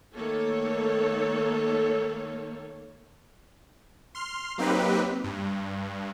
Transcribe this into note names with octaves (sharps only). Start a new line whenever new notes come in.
D#3 A3 A#3 A4 C#5
C6 F6
F#3 A#3 C4 D#4 G4 B4
G2